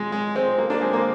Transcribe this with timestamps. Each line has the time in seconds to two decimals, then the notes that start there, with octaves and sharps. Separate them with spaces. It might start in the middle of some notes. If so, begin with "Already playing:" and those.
Already playing: G#3
0.12 G#3
0.36 G#3 C4
0.58 A#3
0.70 A#3 D4
0.81 G#3 C4
0.93 A#3